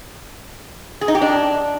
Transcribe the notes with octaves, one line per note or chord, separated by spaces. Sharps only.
G#4
D#4
G4
D4